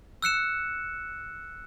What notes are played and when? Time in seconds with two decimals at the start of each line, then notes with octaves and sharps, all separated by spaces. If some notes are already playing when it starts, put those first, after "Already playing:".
0.22 E6 F#6 C#7 E7